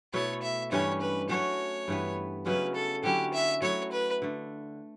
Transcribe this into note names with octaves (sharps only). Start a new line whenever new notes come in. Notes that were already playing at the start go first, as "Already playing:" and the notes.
B2 A3 E4 A4 C#5
E5
G2 E3 G3 C#4 C#5
B4
F#3 A3 C#4 F#4 C#5
G2 E3 B3
C#3 F#3 C#4 E4 B4
A4
D3 F#3 C#4 E4 G4
E5
F#3 A3 E4 A4 C#5
B4
D3 A3